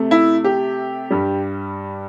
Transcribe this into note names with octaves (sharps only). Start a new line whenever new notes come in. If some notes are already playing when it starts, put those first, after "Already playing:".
Already playing: C3 A3
E4
G4
G2 G3